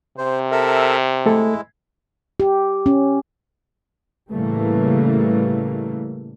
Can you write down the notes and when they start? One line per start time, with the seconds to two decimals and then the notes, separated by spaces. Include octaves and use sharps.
0.18 C3 C5
0.51 A4 A#4 E5
1.26 G#3 A3 E4 A4
2.40 G4
2.86 C#4
4.32 A2 C#3 E3 G3 A3 A#3